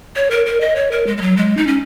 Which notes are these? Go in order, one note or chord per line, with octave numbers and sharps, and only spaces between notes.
C#5
A#4
A#4
D#5
C#5
A#4
G#3
G#3
F#3
G#3
D#4
C#4